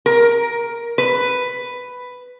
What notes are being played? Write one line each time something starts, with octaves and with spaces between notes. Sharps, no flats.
A#4
B4